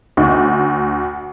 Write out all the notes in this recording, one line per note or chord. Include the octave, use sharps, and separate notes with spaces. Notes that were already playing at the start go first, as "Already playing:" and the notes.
D2